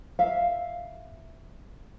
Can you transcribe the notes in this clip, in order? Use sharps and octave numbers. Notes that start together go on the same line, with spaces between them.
E5 F5